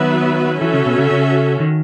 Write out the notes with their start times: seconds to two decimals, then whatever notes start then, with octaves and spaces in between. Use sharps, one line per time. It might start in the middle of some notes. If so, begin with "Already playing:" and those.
Already playing: D#3 F#3 B3 F#4 B4 E5
0.60 E3 C#4 F#4 A4 E5
0.73 C#3
0.85 B2
0.98 C#3
1.10 C#3
1.60 D#3